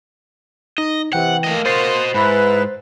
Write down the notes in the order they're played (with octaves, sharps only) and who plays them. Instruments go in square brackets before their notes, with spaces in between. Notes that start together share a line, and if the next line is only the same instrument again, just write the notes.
[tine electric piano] D#4 [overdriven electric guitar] D#5
[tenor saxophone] C3 [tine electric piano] E3 G5 [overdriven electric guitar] F#5
[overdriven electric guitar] A3 D#5 [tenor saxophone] A#3
[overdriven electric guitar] F#4 D#5 [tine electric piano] C5 A6 C7 [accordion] C6
[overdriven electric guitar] G#2 [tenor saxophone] E4 [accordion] B4